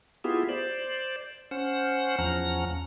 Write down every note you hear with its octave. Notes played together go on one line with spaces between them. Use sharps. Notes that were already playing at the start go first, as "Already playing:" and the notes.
B3 E4 F4 G4 G#4
C5 D5
C#4 C5 F#5
E2 F3 C#4 F#5 A#5